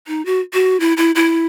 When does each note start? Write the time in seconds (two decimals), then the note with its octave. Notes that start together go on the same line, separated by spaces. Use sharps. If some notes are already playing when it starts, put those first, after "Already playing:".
0.08 D#4
0.26 F#4
0.53 F#4
0.80 E4
0.97 E4
1.15 E4